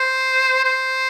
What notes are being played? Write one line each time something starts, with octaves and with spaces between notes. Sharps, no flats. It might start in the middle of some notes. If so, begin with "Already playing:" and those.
Already playing: C5
C5